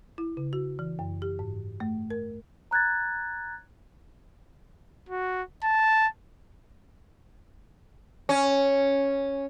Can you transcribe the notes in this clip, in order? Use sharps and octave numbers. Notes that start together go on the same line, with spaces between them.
E4
C#3
F#4
E3
F#2
G4
G#2
A3
A#4
A#5 F#6 G#6 A6
F#4
A5
C#4